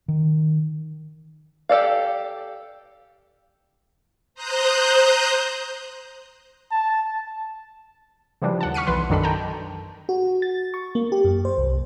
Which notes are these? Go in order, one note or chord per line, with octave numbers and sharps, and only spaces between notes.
D#3
G4 A4 D5 F5
C5 A#5 D#6 F#6 G6
A5
C#3 E3 F3 G3 D4
D#2 F#5 A5
C#6 F6 B6 C#7 D#7
B1 E3 B4 F#5 C6
F#2 D#3 D4 A4 B5
G5 A5 A#5
F#4
A6
C#6
A#3
G4
F#2
C5
C2